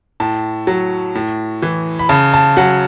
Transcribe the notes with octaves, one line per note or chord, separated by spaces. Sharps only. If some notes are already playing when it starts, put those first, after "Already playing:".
A2 A5
F#3
A2
E3
B5
C#3 A5
A5
F#3 F#5